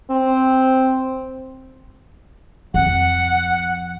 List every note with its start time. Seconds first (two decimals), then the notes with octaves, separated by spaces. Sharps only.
0.11 C4
2.74 F2 F#5